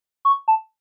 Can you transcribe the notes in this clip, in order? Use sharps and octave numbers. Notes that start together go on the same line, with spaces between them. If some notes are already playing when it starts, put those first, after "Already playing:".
C#6
A5